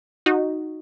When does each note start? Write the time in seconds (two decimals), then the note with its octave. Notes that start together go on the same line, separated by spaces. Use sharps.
0.26 D#4 F#4